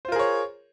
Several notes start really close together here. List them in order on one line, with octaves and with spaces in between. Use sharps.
C5 F4 A#4 G#4 C#5